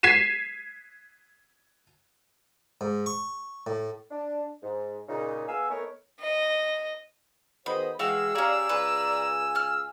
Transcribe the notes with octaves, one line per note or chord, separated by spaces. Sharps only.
G#6 B6 C7 D#7 E7
G#2
C#6
A2
D4
G#2
A#2 C#3 D#4
B3 G#4 F5 G#5 E6
A3 B3 D#4 A#4 B4 C#5
D#5
D#3 B3 F#4 G#4 C5 D#5 B5
E3 G#3 F#4 G#4 F5 G5 E6
C#4 G4 G#4 D5 F5 A#5
C#2 B4 F5 G#5
F6 F#6